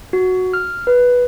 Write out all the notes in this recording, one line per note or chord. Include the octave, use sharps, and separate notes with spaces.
F#4
F6
B4